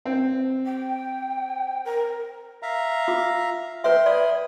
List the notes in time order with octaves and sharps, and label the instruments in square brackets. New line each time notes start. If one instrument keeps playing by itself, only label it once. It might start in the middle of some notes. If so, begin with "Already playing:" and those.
[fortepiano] C4
[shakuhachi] G5
A#4
[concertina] E5 F5 A#5
[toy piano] F4
[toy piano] B4 E5 [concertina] G5 C6
[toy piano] D5 [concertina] B5 D#6